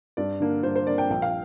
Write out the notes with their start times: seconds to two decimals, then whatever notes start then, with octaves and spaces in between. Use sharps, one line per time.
0.17 G2 D5
0.40 D3 A#3 D4
0.63 G2 C5
0.76 C5
0.87 D3 A#3 D4 D5
0.98 G5
1.10 A#1 G5
1.22 F5